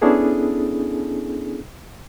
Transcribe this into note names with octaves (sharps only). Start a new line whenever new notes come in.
B3 C#4 D4 E4 G#4 A4